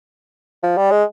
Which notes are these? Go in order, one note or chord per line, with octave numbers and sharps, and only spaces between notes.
F3
G3
G#3